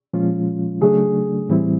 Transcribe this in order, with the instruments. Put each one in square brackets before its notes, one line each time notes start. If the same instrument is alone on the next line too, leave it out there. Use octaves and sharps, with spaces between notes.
[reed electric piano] A#2 F3 G#3 C#4 F4
[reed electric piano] C#3 F#3 A3 D4 [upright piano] G#4
[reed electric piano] A2 E3 G3 C4 E4